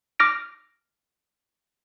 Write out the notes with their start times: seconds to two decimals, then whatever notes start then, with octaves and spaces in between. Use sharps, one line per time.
0.19 D6 F6 A#6 D7